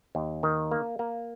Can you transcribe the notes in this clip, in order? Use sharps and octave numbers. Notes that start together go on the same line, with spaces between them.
D#2
D#3
A#3
A#3